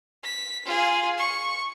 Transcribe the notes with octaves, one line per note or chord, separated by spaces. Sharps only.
B6
F4 G#4
C#6